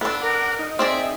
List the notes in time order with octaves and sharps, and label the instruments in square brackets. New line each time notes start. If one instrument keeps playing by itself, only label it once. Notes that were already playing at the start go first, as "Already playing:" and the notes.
[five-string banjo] B3 D4 [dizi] A4
[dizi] A#4 [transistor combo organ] F#5 D6
[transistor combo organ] D#4
[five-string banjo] C4 G#4 D5 [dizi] E5